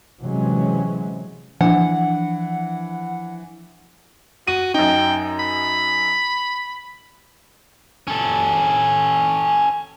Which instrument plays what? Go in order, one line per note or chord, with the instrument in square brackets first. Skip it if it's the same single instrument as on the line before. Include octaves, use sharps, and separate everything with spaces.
[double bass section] C3 E3 F#3 G#3 C#4
[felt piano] E3 [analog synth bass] F3 [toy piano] D4 [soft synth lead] F#5
[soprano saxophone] F#4 [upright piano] D#7
[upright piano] F#2 D#4 [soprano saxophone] G5
[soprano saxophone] B5
[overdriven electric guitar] C#4 A4